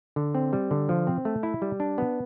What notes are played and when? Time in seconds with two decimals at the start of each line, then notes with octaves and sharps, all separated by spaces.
0.16 D3
0.35 C4
0.53 G3
0.71 D3
0.89 F3
1.07 C4
1.25 A3
1.43 E4
1.62 G3
1.80 D4
1.98 B3